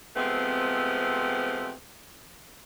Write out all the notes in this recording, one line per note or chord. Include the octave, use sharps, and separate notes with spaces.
C3 F3 G#3 A3 B3 C4